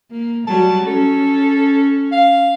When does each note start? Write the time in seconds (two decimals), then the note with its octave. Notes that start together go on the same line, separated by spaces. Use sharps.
0.11 A#3
0.47 F#3 G3 A5
0.86 C#4 A4
2.12 F5